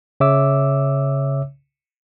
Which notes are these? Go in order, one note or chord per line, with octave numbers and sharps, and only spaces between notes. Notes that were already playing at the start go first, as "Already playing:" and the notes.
C#3 C#5 E5 D6 E6